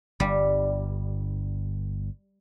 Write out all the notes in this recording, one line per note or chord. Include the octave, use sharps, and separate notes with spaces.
G1 G2 G3